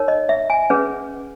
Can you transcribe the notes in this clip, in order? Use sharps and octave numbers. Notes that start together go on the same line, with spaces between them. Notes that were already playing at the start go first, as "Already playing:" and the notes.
Already playing: D#4 A#4 C#5
D#5
E5
G#5
C#4 G#4 B4